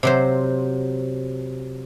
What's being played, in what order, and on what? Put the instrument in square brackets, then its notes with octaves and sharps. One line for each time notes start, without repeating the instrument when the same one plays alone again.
[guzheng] C3 F#3 C5